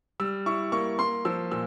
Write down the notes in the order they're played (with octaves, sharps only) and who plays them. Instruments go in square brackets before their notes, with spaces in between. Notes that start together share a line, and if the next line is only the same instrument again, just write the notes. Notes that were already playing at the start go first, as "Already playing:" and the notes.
[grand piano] G3 E6
E4 C#6
A#3 C#6
A#3 C6
F3 E6
A#2 E6